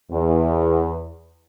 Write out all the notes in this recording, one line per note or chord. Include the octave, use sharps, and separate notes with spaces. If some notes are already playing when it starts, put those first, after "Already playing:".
E2